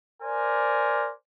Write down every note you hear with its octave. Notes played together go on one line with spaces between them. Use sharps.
A#4 C5 D5 G#5